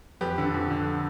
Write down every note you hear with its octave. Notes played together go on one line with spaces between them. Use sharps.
F2 G4 B4
D3
F2
D3